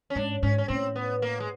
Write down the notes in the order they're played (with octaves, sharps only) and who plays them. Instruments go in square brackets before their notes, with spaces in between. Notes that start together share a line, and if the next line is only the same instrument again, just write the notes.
[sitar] C#4
[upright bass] G#2 [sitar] D4
[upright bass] G#2 [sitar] C#4
[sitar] C#4
[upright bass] A2 [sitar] C4
[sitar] B3
A#3
G#3